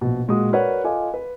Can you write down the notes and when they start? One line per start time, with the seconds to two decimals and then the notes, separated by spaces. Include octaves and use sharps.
0.01 A#1 B2
0.28 A#2 G#3 F#4 D#6
0.52 F#4 A#4 B4 C#5 D5 F#5
0.84 F4 A4 D#5 F5 G#5 D6
1.14 B4